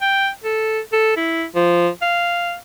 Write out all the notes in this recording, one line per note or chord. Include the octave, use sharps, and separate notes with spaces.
G5
A4
A4
E4
F3
F5